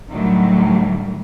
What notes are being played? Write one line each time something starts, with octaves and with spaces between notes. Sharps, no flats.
A2 D3 D#3 F#3 G3 A3